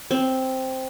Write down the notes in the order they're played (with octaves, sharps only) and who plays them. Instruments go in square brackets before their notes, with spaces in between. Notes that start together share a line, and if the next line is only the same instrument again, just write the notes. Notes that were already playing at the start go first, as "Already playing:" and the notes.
[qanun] C4